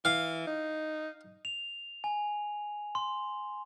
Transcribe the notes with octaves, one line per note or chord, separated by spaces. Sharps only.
E3 F5
D#4
F7
G#5
C6